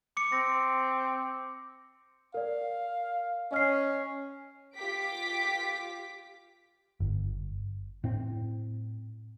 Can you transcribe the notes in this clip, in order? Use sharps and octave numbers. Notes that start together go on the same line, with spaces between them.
D6 C#7
C4 A#6
A#4 D5 F5
C#4 D#5 F6 C7
F4 G4 D6 B6 D7
G1
A2 C4